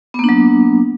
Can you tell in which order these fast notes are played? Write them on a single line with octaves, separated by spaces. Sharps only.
B3 A#3 D4 F#3